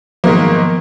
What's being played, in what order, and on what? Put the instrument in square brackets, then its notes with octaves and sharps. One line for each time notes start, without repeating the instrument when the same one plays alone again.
[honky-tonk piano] G#2 D#3 A#3 [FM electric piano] F3 F#3 B3